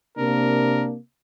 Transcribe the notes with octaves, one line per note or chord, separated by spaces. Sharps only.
C3 A#3 D4 A#4